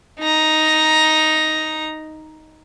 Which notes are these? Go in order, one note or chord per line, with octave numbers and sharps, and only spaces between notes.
D#4 A#5